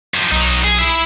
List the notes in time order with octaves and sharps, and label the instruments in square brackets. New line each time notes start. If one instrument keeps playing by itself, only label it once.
[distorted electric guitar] F#2 F3
[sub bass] B1 [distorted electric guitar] F#3 D#4
[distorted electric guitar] G#4
E4 E5